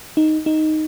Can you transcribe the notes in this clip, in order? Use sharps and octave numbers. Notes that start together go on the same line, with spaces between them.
D#4
D#4